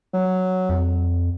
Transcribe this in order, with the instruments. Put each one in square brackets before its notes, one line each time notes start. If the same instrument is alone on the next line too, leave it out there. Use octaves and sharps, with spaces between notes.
[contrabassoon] F#3
[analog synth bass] F2